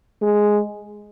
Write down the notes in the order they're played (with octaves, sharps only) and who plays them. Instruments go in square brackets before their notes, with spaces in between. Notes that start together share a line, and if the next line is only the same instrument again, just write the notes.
[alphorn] G#3